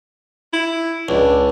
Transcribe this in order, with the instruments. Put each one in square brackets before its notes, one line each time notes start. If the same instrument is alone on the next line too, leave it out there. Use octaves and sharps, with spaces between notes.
[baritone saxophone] E4
[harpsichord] C#2 [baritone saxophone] D4